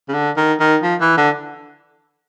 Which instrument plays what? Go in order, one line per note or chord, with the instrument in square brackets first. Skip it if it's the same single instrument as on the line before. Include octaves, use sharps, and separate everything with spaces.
[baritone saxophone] C#3
D3
D#3
D#3
F3
E3
D3